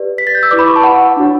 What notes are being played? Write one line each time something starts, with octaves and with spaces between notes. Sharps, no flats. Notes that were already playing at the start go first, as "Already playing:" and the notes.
Already playing: G4 B4 D5
B6
A6
G6
E6
E4 B4 D5 D6
B5
C#6
A5
F#5
D4 F#4 C#5